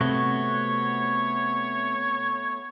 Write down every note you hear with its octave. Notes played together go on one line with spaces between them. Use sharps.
C3 A3 B3 F#4 C#5